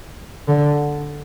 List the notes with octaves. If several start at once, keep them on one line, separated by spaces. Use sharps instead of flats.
D3